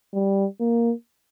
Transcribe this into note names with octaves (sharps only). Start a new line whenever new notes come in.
G3
A#3